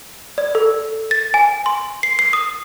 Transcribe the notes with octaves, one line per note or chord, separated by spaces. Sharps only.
D5
A4
A6
G#5
C6
C7
C7
D#6